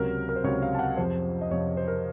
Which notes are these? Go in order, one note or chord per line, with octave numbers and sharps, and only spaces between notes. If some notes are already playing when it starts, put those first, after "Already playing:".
Already playing: C#2 C3 F#3 A#4
A#4
C5
C#2 C3 F#3 C#5
F5
A5
F#5
F2 C3 F3 C5
D#5
F2 C3 F3 C#5
C5
A#4